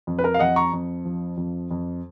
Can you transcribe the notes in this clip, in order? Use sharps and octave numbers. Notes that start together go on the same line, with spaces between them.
F2
B4
A#4
F5
F2 D#5 F#5
A#5 C#6
F2
F3
F2
F2